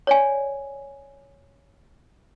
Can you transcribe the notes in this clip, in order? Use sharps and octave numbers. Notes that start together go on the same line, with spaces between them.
C#5 D5 G#5